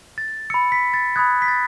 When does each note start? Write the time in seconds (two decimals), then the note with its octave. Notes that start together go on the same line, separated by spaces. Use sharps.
0.18 A6
0.50 B5 E6 C#7
0.72 B6
0.94 A6
1.16 B5 D#6 F#6 G#6
1.42 B6
1.48 A6